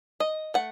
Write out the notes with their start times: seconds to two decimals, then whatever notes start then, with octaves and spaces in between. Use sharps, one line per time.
0.20 D#5
0.54 A3 F#5